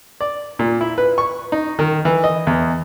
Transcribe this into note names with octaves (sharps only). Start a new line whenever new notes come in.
D5
A#2
E4
B4
C#6
D#4
D#3
E3
D#5
E2